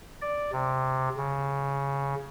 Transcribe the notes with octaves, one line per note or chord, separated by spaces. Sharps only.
D5
C3
C#3